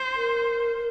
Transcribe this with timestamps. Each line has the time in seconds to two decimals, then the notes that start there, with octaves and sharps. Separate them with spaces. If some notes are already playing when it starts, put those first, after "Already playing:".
Already playing: C5
0.16 A#4